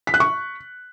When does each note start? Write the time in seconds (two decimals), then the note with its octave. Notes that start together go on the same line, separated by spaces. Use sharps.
0.07 B6
0.14 F#6
0.20 C#6